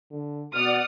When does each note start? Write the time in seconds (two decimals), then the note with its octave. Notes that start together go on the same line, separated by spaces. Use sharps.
0.11 D3
0.53 B2 D5 F#5 D#6 F6